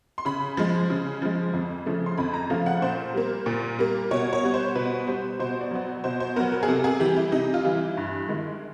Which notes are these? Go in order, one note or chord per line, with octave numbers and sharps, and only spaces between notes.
C6
C#3 B5
F3 G#3
C#3
F3 G#3
F2
C#3 F3 A3
C6
F2 B5
A#5
C#3 F3 A3 F5
F#5
A#2 C5
G3 A#3
A#2
G3 A#3
B2 C#5
C#5
G3 B3
C5
B2 B4
G3 B3 C5
B2 C5
D5
F#3 B3
B2 C5
C5
F#3 B3 A#4
A#4
G#4
C3 A4
G#4
E3 G3 G4
E4
C3 D#4
F4
E3 G3
E4
G2
D#3 G#3